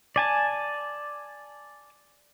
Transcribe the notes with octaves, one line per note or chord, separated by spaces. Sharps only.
D5 G#5 A5